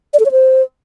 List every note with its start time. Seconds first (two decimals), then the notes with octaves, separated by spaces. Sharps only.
0.14 D5
0.20 A4
0.26 C#5
0.32 C5